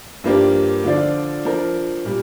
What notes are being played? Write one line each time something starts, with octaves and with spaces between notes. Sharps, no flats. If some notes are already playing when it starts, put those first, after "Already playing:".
G2 F3 A#3 D4 G4
D3 F3 D4 F4 D5
F3 D4 A#4
A#2 G3